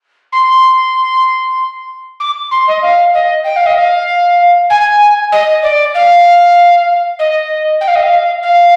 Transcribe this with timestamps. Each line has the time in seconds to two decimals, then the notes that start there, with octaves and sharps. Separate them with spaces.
0.32 C6
2.20 D6
2.51 C6
2.67 D#5
2.82 F5
3.13 D#5
3.44 G5
3.56 F5
3.66 D#5
3.77 F5
4.69 G#5
5.32 D#5
5.62 D5
5.94 F5
7.19 D#5
7.80 G5
7.87 F5
7.95 D#5
8.02 F5
8.42 F5